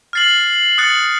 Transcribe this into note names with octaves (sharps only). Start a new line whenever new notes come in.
F6 A6 C7 F#7
D#6 F#6 A6 C#7 F#7